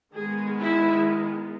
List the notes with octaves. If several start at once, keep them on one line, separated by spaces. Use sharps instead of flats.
D#3 G#3 B3 G#4
E4